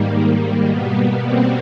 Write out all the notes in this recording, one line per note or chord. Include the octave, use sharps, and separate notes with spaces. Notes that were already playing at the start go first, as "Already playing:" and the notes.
Already playing: G#2 D#3 G3 A#3
A#3
B2 G3 A#3 B3
C4